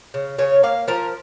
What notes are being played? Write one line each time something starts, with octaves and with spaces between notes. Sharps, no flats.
C#3
C#3 C#5
A#3 F5
F3 A#4